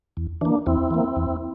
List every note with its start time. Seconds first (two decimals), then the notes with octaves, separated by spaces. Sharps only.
0.17 E2
0.41 E3 A#3 D4
0.66 E2 C4 E4
0.91 E3 A#3
1.16 E2